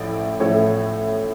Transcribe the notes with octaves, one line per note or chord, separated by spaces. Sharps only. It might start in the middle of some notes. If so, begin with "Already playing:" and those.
Already playing: A1 A2 F3 A3 D5
A1 A2 F3 A3 C#5